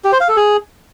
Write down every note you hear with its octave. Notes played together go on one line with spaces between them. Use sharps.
G4
C5
F5
A4
G#4